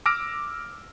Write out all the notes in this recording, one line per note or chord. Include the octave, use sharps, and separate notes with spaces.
D6 E6 F6 A#6 D7